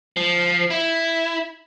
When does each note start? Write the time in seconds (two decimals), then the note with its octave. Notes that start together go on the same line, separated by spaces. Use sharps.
0.17 F3
0.71 E4